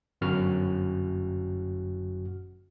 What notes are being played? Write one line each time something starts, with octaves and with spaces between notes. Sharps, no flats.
G1 F#2 F#4 F6